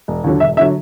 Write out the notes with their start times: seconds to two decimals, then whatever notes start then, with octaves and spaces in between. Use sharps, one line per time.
0.08 E1
0.24 D#2 D3 F#3
0.40 E1 E5
0.57 D3 F#3 E5